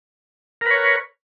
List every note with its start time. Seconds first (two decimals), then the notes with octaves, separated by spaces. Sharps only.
0.61 A#4
0.66 B4
0.71 C#5